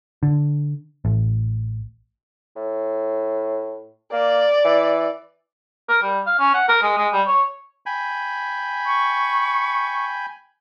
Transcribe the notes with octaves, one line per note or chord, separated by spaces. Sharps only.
D3
A1
A2
A#3 D5
E3
A#4
G3
F5
C#4
F#5
A#4
G#3
G#3
G3
C#5
G5 G#5 B5
C#6